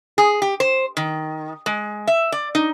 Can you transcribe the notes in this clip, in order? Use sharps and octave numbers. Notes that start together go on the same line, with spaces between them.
G#4
G4
C5
D#3
G#3
E5
D5
D#4